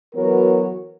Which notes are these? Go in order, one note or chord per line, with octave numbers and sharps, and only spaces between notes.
E3 F#3 B3 F#4 A#4 C#5